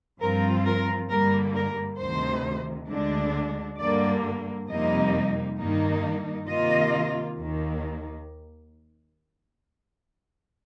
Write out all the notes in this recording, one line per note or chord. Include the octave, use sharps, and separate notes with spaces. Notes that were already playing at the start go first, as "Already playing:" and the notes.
G2 F3 C4 F4 A#4
A#4
G2 D3 G3 A#3 A#4
A#4
D2 C3 D#3 C5
D2 D3 G#3 D4
G2 D3 G3 A#3 D5
F2 C3 G3 A#3 D#4 D#5
G2 D#3 A#3 D#4
C3 D#3 A#3 F4 D#5
D#2 D#3 A#3